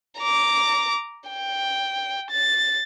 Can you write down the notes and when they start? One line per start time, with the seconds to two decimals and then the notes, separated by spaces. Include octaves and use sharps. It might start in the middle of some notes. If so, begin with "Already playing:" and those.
0.20 A#5 D6
1.30 G5
2.31 A6